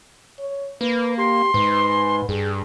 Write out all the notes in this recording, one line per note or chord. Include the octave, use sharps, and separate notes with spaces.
C#5
A#3 B4
G4 C6
G#2 B4
G2 G#4